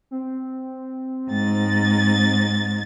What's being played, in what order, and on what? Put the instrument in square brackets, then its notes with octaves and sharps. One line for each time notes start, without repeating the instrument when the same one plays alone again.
[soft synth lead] C4
[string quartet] G#2 A6